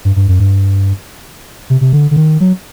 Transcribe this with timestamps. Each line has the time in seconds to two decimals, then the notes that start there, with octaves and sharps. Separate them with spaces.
0.05 G2
0.16 G2
0.28 F#2
0.40 G2
1.70 C3
1.81 C3
1.93 D3
2.11 D3
2.16 D#3
2.40 F#3